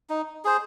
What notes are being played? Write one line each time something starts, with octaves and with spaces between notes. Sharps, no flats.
D#4
G#4 C5